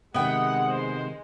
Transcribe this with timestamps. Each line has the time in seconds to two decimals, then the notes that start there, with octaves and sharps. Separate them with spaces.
0.14 C3 D#3 G#3 B3 F#5 G5
0.68 C5